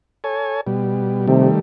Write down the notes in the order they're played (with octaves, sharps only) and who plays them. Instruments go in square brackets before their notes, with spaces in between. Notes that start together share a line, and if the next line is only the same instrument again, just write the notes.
[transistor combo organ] A4 C#5 G#5
B2 G3
[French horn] C3 [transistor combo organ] D#3 G3 A3